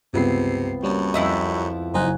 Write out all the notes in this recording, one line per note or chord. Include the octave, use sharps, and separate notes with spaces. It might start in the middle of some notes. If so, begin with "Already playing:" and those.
C#2 G2 C3 B3 C4 C7
F#2 G3 A#3 C#4
F2 E4 D#5
F#1 D#4 C5 G#5 F#6